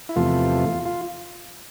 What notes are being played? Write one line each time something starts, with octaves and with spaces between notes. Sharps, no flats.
E4
E2 C3 F3 A3 F4
F4